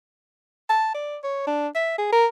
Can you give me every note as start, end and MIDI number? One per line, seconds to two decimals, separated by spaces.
0.69 0.90 81
0.94 1.18 74
1.24 1.44 73
1.47 1.68 62
1.75 1.95 76
1.98 2.11 68
2.12 2.26 70